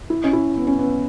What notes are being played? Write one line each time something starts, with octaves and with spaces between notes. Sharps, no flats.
E4
C#4
E4
B3
C#4
B3